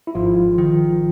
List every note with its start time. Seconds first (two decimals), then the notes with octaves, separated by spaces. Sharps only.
0.07 E4
0.15 G#1 F3 F4
0.58 D#3